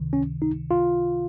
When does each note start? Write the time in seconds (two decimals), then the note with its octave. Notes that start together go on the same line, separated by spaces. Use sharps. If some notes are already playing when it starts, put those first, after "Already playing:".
Already playing: C#2 C3 D#3
0.13 C#4
0.42 D#4
0.71 F4